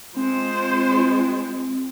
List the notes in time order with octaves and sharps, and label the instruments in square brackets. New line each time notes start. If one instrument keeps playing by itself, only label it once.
[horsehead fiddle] G#3 F4 [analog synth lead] C4 [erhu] C5